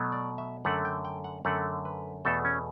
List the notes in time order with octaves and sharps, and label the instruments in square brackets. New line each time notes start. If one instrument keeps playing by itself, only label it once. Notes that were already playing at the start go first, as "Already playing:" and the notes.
Already playing: [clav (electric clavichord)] B2 F#3 A3
D5
E5
F#2 D3 A3 F#5
G5
G5
F#5
F#2 D3 A3 F#5
B4
E2 B2 A3 A4
C#4